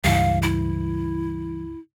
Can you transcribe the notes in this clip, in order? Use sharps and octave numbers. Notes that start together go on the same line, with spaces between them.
C#2 G2 E3 G3 F5
E4